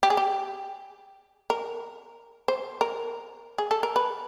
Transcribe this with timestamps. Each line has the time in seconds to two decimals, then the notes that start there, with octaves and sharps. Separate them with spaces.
0.03 G4
0.10 G#4
0.17 G4
1.50 A#4
2.48 C5
2.81 A#4
3.58 G#4
3.71 A4
3.83 A#4
3.96 B4